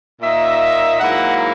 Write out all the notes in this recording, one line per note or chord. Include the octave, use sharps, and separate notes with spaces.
A#2 A#3 D#4 E5
G#2 F#3 A#3 E4 F#5